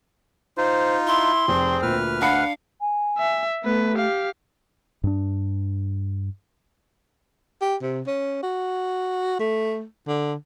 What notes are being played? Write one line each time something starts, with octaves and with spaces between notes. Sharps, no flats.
D#4 F4 C5
E4 C6
F1 C4 G#4
D2 A#2 B4 F6
D4 F5 F#5 B5 C#7
G#5
E5
A3 B3 B4
G4 F5
G2 D4
G4
C3
C#4
F#4
A3
D3